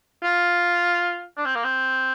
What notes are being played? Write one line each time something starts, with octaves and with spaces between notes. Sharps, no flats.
F4
D4
C4
A#3
C4